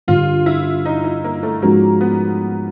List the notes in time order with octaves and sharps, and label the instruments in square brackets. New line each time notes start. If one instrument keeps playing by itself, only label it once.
[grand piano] G2 D3 G3 [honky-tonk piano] F4
[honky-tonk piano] E4
D#4
E4
A#3
A3
[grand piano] G#2 F3 G#3 C#4 F#4 [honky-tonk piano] A#3
[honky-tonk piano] B3